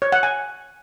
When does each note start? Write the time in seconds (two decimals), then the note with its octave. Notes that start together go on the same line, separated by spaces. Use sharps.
0.02 C#5
0.12 F#5
0.23 G#5